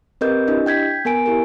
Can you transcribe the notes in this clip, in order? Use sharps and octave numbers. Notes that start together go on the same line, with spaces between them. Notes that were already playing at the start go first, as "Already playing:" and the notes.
C4 G4 A#4 B4 D#5 G6
D4 E4 G4 D#5
G5 G6 G#6 B6
B3 A#4 G#5 D7
E4 G4 A#4